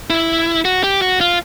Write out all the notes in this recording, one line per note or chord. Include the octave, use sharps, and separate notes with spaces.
E4
F#4
G4
F#4
F4